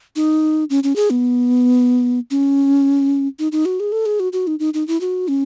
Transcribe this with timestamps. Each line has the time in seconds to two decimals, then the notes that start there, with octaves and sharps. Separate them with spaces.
0.16 D#4
0.70 C#4
0.83 C#4
0.96 G#4
1.10 B3
2.31 C#4
3.39 D#4
3.52 D#4
3.65 F#4
3.80 G#4
3.92 A4
4.06 G#4
4.20 F#4
4.33 F#4
4.47 D#4
4.59 D#4
4.74 D#4
4.88 E4
5.01 F#4
5.28 C#4